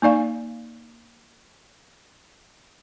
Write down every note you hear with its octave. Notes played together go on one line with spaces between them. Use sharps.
A#3 D#4 D5 F5